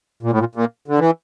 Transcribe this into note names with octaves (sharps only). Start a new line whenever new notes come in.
A#2
A2
A#2
A#2
D3
E3